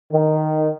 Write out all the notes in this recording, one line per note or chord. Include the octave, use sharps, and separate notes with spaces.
D#3